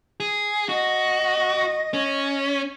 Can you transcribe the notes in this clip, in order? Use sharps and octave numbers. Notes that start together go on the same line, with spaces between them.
G#4
F#4 D#5
C#4